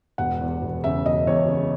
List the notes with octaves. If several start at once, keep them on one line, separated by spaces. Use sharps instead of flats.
E1 F#5
E2
E1
C#3 E5
E1 D#5
E2 C#5
C#3